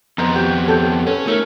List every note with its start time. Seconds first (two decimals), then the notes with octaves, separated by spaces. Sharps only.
0.18 F2 B3 C5 D#5 A#5
0.35 F#4 G4
0.66 G4 A4 C#5
1.07 C#4 A4 B4
1.27 A3 D#4 F#4 A#4